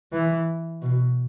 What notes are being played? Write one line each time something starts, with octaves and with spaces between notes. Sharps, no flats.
E3
B2